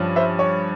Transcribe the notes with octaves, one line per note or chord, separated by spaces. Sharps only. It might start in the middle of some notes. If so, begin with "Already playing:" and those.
Already playing: G2 F3 C#4
C5 E5
C#5